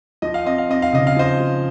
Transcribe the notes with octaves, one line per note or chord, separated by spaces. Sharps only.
F3 D#5
F5
C4 D#5
F5
C4 D#5
F5
C#3 D#5
F5
F3 C5 D#5
F3